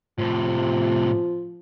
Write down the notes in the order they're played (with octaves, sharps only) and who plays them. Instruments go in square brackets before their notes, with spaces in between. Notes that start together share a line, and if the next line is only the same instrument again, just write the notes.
[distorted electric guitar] A2 C3 [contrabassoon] F3